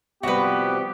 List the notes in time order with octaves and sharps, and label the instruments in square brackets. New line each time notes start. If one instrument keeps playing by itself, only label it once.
[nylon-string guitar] C3 F3 G3 [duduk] B3 [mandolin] F#4 B4 [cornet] G4